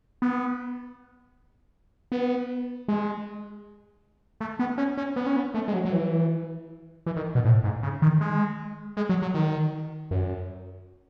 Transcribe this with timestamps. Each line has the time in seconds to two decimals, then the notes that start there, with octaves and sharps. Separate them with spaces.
0.22 B3
2.12 B3
2.88 G#3
4.41 A3
4.59 B3
4.78 C#4
4.97 C#4
5.16 B3
5.26 C#4
5.36 B3
5.54 A3
5.68 G#3
5.73 F#3
5.85 F#3
5.92 E3
7.06 E3
7.16 D#3
7.35 B2
7.45 A2
7.64 G#2
7.83 C#3
8.02 D#3
8.21 G#3
8.97 G#3
9.09 F#3
9.22 F#3
9.34 D#3
10.11 F#2